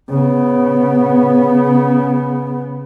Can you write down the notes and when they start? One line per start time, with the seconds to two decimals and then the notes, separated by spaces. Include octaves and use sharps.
0.10 C#3 B3